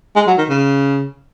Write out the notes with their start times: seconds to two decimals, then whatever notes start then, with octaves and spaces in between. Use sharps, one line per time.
0.16 G#3
0.27 F#3
0.38 D#3
0.50 C#3